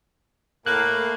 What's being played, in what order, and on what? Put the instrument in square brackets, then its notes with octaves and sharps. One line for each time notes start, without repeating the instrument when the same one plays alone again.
[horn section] A2 A#3 [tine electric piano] F#6